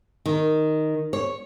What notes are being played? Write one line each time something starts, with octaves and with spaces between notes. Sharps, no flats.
D#3
C#5